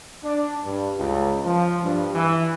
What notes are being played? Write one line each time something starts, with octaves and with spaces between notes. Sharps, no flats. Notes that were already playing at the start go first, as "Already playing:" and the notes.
D4
G2
C#2
F3
G2
E3